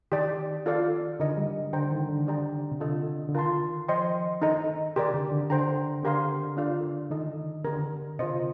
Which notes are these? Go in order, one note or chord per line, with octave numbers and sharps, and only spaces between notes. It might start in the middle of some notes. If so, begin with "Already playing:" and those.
D#3 G4 D5 A5
F4 A4 D5 F5
D3 D#4 A#4 D#5
G3
D3 C5 G5 A#5
D#3
D3
D4 G4 D5 G5 A#5
C3
D3 F4 A4 D#5
D3
D#3 F4 A#4 F5 A5 C6
F3 C5 D#5 G5 C6
D#3 D#4 A4 D#5 A#5
C3 G4 A#4 D5
D3
D3
D3 C5 G5 A#5
D3 D4 G4 A#4 F5 C6
D4 F4 A4 D5 F5
D#3 D#4 A4 D#5
D3 D4 G4 A#4
C3 F4 C5 D#5